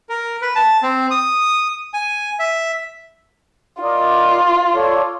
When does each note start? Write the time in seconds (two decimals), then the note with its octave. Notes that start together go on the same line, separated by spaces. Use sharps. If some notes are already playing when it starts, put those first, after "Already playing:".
0.09 A#4
0.42 B4
0.56 A5
0.83 C4
1.11 D#6
1.94 G#5
2.40 E5
3.82 F4 A#4 D5 D#5
4.74 A4 C#5 D5